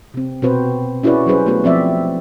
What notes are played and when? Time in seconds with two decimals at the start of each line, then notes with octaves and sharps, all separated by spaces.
0.14 C3 C4
0.42 B2 C4 F#4 B4 C5
1.03 C#4 E4 F#4 G#4 B4 D5
1.26 F#3 G3 C#4 G#4 B4 C5
1.46 A3 B3 F#4 B4
1.64 F3 C4 D5 E5